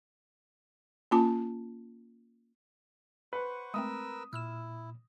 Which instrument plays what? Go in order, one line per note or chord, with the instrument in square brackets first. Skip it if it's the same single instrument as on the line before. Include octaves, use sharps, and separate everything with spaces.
[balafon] A#3 C#4 F4 A5 D6
[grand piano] B4 [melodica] C5 F#5 C#6
[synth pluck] G#3 A3 C4 [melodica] A#4 B4 E6 [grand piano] D#6
[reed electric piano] A#2 [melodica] E4 [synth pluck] E6 F6 E7